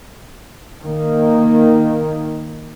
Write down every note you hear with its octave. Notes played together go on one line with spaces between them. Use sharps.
D#3 A#3